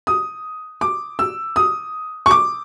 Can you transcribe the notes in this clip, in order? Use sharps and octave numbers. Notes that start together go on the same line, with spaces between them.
D#6
D6
E6
D#6
C#6
D6